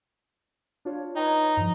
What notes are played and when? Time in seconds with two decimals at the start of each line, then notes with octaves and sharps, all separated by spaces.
0.85 D4 F4 C#5
1.16 D#4 B4 C#5 G5
1.57 G2 F3